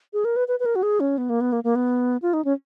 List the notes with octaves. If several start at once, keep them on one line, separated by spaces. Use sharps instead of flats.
G#4
A#4
B4
B4
B4
A#4
F#4
G#4
C#4
B3
A#3
B3
A#3
A#3
B3
F4
D#4
C#4